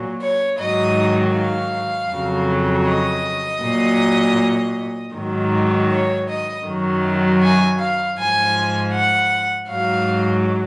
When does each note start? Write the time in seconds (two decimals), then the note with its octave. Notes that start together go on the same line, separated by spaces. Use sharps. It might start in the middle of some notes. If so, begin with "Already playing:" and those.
Already playing: A#2 F#3
0.22 C#5
0.59 G#2 D#3 F#3 D#5
1.36 F5
2.11 F2 C#3 F#3
2.88 D#5
3.62 A#2 F#3
5.14 G#2 D#3 F#3
5.90 C#5
6.28 D#5
6.66 F#2 D#3 F#3
7.42 G#5
7.79 F5
8.18 G#2 F3 G#5
8.93 F#5
9.69 G#2 F#3 F5